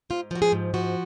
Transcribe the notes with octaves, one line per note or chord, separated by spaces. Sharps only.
G#2 F4
F3 F#4
G#4
G#2
F3 F#4